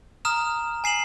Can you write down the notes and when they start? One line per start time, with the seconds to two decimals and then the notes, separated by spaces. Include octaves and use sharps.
0.25 A#5 D#6 F6 E7
0.84 G#5 C7 E7 F#7